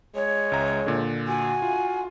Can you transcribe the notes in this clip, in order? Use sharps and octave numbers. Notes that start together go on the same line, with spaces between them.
G#3 C#5
C#2 E5 A#5
A#2 D3
F#4 G#5
F4